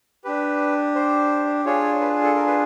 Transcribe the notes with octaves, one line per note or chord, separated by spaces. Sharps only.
D4 G4 B4
C5
D4 F4 G#4 C#5
B4
A4
A#4
B4